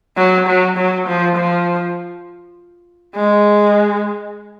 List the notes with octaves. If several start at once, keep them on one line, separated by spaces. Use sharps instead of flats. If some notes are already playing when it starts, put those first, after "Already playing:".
F#3
F#3
F#3
F3
F3
G#3